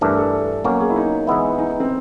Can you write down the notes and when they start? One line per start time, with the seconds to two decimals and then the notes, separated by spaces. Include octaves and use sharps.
0.01 G2 E3 A3 D4 A#4
0.18 A4
0.65 B2 F#3 A#3 C#4
0.80 G#4
0.90 E4
0.96 D#4
1.27 E3 G#3 B3 E4
1.58 D#4
1.70 D#4
1.80 C4